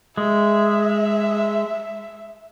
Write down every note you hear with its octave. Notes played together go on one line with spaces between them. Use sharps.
G#3 E5